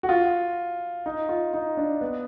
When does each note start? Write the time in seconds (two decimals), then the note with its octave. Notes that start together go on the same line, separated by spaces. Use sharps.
0.03 F#4
0.09 F4
1.06 D#4
1.29 F4
1.54 D#4
1.77 D4
2.01 B3